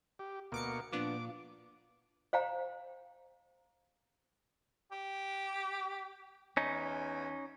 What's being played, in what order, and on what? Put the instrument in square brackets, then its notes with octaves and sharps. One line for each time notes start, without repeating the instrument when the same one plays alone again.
[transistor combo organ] G4
[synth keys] D2 D6 C#7 [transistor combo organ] B2 A#3
[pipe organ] A#2 A#3 [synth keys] F3 B3 D4 [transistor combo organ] D6
[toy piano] C5 F5 G5 A#5
[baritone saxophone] G4
[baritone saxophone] E2 [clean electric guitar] C#4 D#4